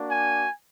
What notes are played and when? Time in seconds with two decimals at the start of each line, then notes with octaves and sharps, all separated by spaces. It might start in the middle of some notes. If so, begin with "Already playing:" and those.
Already playing: A#3 D4 F#4
0.11 G#5